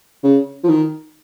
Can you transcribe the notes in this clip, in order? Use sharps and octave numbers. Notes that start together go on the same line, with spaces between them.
C#3
F3
D#3